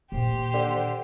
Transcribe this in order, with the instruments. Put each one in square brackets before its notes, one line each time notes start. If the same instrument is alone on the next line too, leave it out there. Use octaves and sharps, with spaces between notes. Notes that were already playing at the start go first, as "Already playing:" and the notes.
[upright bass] A#2 D#3 [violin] G4 C5
[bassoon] D3